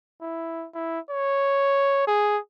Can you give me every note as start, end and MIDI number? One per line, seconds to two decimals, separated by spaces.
0.22 0.67 64
0.75 1.00 64
1.10 2.07 73
2.07 2.39 68